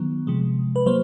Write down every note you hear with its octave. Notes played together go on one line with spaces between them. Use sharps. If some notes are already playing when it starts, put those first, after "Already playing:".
Already playing: D#3 F#3 B3
C3 F3 G#3
B4
F#3 A#3 C5